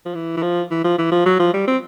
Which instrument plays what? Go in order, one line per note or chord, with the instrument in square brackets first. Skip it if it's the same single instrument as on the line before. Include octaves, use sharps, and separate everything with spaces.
[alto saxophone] F3
E3
E3
F3
E3
F3
E3
F3
F#3
F3
G3
C4